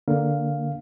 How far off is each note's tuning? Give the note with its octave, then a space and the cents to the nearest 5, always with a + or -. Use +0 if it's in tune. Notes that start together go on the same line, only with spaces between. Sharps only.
D3 +0 A#3 +0 F5 +0